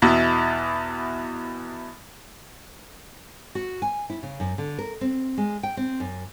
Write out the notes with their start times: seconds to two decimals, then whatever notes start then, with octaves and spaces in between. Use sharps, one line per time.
0.02 E2 B2 E4
3.55 F#4
3.82 G#5
4.10 E4
4.23 C#3
4.40 F#2
4.58 D3
4.78 A#4
5.01 C4
5.38 G#3
5.63 G5
5.77 C4
6.00 F#2